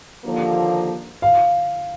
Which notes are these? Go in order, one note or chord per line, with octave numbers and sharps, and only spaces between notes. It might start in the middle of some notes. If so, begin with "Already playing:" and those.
D#2 D3 F3 A#3
F5